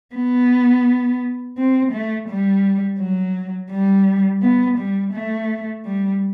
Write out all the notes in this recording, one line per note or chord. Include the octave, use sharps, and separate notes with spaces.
B3
C4
A3
G3
F#3
G3
B3
G3
A3
G3